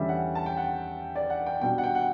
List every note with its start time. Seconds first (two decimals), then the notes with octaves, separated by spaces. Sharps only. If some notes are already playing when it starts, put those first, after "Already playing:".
Already playing: E2 D3 G3 C#4 E5
0.09 F#5
0.35 A5
0.46 G5
0.57 F#5
1.15 D5
1.30 F#5
1.46 G5
1.61 B2 G3 D4 G5
1.78 F#5
1.83 G5
1.95 F#5